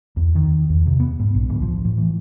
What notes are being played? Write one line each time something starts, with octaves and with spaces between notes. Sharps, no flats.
E2
D#3
E2
C3
B3
G#2
A#1
D1
F3
A2
E3